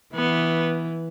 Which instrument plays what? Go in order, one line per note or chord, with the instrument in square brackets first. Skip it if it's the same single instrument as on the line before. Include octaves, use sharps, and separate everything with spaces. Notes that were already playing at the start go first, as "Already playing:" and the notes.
[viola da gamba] E3 [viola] B3